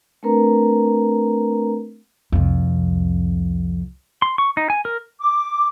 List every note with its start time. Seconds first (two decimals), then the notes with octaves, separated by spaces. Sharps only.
0.23 A3 C4 D4 A#4 B4 A#5
2.32 C2 F2
4.22 C6
4.38 C#6
4.57 D#4
4.70 G#5
4.85 A#4
5.21 D6